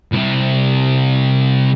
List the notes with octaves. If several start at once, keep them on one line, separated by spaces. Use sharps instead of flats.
C2 C3